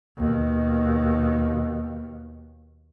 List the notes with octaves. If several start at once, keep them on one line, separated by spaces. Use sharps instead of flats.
D#2 B2